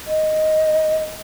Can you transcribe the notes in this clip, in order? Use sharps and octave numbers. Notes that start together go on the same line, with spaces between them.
D#5